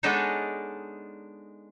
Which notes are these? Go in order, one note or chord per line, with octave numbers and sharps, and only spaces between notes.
G#3 B3 D4 D#4 A4 C#5